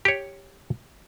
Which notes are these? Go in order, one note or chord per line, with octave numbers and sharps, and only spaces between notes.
G4 C#5